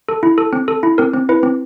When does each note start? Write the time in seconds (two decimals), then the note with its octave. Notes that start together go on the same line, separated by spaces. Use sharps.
0.09 A4
0.23 E4
0.38 A4
0.53 C4
0.68 A4
0.83 E4
0.98 C4 A#4
1.14 C4
1.29 E4 B4
1.43 C4